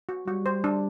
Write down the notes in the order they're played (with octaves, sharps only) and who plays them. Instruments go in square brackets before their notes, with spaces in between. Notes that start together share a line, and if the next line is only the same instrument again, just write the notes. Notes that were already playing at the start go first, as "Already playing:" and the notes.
[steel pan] F#4
[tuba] G3 [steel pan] F#4
[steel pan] C5
D4